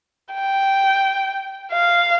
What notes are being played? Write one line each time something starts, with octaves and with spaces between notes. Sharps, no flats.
G5
F5